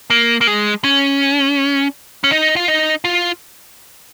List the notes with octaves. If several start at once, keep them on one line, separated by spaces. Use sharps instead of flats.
A#3
A#3
G#3
C#4
C#4
D#4
F4
D#4
F4